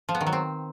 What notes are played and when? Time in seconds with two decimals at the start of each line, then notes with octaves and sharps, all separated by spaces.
0.09 F3
0.15 B3
0.21 D#3
0.27 F#3
0.33 C4